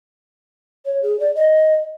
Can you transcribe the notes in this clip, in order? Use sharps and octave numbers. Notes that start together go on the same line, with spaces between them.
C#5
G#4
D5
D#5